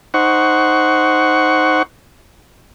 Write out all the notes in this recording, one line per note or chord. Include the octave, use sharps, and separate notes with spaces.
D#4 C5 F#5 C#6